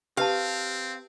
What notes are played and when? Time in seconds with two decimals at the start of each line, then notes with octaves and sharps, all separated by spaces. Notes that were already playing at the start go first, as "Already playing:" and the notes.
0.17 C4 G4 B4 F5 A5